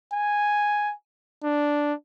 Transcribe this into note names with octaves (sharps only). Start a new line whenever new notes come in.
G#5
D4